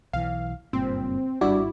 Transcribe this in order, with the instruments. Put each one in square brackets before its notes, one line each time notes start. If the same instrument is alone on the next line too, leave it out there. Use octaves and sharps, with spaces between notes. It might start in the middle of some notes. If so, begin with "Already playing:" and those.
[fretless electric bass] B1 E3 [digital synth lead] F5
[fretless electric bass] F#1 G2 A#2 [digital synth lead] C4
[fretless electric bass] G#1 [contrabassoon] G2 [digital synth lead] E4 [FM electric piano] F#4 D5